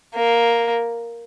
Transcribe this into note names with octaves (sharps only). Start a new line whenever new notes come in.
A#3